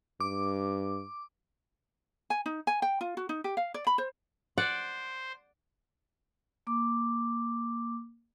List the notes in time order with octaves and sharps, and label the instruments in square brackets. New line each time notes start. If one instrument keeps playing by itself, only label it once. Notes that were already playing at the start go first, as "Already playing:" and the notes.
[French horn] G2 [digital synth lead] D6
[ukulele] G#5
D#4
G#5
G5
F4
F#4
D#4
G4
F5
D5
B5
C5
[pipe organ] C5 [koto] D5 [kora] F#5
[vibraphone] A#3 D6